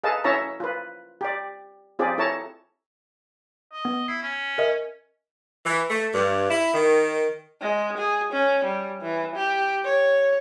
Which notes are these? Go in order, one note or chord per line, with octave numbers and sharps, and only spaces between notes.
G#4 A4 B4 D#5 F5 A5
C#4 E4 C#5 E5 A5 A#5
F4 B4
G4 D5
C4 F4 G4 G#4 D5
E4 A4 C#5 A5 A#5
D#5
B3
E4 C7
C#4
A#4 D#5 E5
E3
A3
G2
E4
D#3
G#3
G#4
C#4
G3
E3
G4
C#5